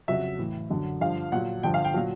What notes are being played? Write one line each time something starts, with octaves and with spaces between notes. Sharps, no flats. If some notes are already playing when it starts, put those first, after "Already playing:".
F2 C#3 F#3 E5
A2 E3
F#2 D3 F#3
G2 D3 F3 F5
A#2 F#3 F#5
G2 D3 F3 G5
F5
G5
A#2 F#3